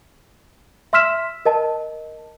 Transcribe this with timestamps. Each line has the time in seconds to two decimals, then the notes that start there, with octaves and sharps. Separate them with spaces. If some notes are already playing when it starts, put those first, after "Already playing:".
0.93 E5 C6 E6 F6 B6 E7
1.46 A#4 D#5 A5